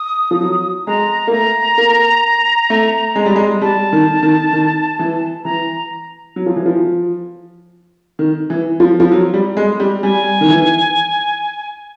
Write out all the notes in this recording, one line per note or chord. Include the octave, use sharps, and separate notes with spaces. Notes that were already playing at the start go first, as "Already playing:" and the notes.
Already playing: D#6
F3
F#3
G#3 A#5
A#3
A3 A#5
A#3
A3
G#3
G3
G#3
G3 A5
D#3
D#3
D#3
E3
E3 A#5
F#3
F3
E3
F3
D#3
E3
F3
F3
F#3
G3
G#3
G3
G3 G#5
D#3
E3